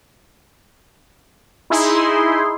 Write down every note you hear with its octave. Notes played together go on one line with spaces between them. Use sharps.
D#4 E4 G#4 C6